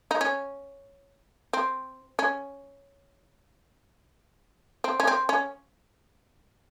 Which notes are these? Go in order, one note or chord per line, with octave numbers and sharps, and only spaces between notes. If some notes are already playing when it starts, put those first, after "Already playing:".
D#4
C#4
C4
C#4
C4
C#4
C4
C#4